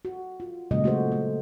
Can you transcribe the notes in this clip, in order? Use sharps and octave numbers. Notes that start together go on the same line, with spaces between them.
F#4
F4
A#2 C#3 F#3 G#3 D#5
A3 F#4 G#4 C5
A3